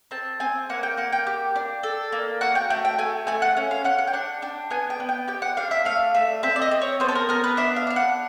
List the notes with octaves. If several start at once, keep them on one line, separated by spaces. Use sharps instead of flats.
C4 A5
C4 G#5
A#3 F#5
G5
A#3 F#5
G5
G4
D4
A4
A#3
F#4 F#5
G5
A3 G5
G5
A3 G#5
A3 G#5
F#5
C#4
F5
C#4 F#5
F#5
G5
D4 F#5
D4 G5
B3 G#5
G5
B3
G5
G4 G5
F#5
D4 F5
E5
A3 F5
A3 E5
C4 E5
D5
D#5
C4
C#5
B3 C5
A4
A#4
B3 A#4
B4
D4 E5
F5
D4 F5
F#5